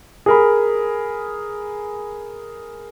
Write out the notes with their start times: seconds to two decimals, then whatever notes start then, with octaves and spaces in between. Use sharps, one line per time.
0.26 G#4 A#4 B5